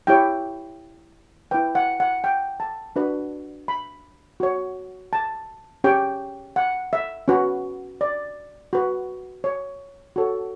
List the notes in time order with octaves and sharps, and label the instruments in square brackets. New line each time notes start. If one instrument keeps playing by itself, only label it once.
[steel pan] E4 G4 C#5 G5
E4 B4 G5
F#5
F#5
G5
A5
D4 F#4 B4
B5
F#4 C#5
A5
C#4 G4 C#5 G5
F#5
E5
C#4 F#4 B4
D5
F#4 B4
C#5
F#4 A4 C#5